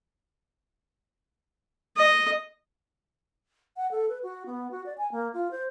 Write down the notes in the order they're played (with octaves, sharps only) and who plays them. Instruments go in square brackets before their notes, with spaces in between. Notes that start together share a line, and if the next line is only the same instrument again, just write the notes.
[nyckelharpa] D#5
[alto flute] F#5
A4
B4
F#4
B3
F#4
D5
G#5
A#3
F4
C5